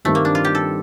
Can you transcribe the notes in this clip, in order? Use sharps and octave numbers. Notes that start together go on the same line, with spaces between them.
G2 D#3 G3 A3 C4
A#3
D4
F4
G4
A4